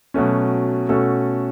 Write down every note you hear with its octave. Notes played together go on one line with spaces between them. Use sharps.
B2 F#3 A3 C#4
B2 A3 C#4 F#4 A4